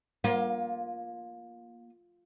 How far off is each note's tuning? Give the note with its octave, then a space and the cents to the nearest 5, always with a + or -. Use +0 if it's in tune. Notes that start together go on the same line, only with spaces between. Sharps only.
A#3 +25 F4 +0